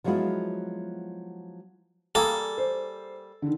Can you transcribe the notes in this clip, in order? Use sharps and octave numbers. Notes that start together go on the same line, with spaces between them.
F3 F#3 G#3 B3 E4 F4
G3 A#3 G#4 A4
C5
D3 D#3